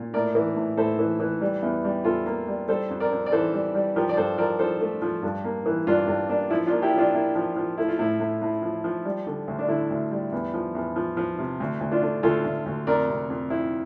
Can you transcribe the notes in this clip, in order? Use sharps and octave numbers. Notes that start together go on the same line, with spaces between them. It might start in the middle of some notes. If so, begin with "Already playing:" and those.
Already playing: A#2
A2 A#4 D5
E3
A2
A2 A4 C5
E3
E3
G3
E2
G3
E2 F4 A4
A#3
G3
G3 A4 C5
F2
A#4 D5
F2
D5
E3 A4 C5
G3
G3
F3 G4 A#4
D5
G2 A4 C5
F3 A#4 D5
F3 A4 C5
A3
F3
G2
A#3
E3
G2 D4 F4
G2
A#3 D4
F3 E4
D4 F4
A#3
E4 G4
F3
D4 F4
A#3 E4
F3
F3
A3 E4
F4
A2 E4
A2
A2
F3
F3
G3
D3
D2
D4
D3 E4
D2
G3
E2
F3
E2
F3
F3
C3
D2
D2
D4 F4
D3
D2 F4 A4
D2
D2
F2 A#4 D5
C3
F2
F2 E4